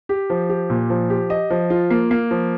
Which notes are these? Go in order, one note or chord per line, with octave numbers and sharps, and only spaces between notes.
G4
F3
G4
A#2
F3
G4
D#5
F3
F4
A#3
A#3
F3